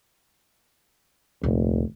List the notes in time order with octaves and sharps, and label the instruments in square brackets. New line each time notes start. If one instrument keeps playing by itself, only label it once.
[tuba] F1 [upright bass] D2 A#2